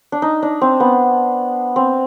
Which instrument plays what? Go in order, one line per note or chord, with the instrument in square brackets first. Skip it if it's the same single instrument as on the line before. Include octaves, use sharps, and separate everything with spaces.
[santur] D4
D#4
D4
C4
B3
C4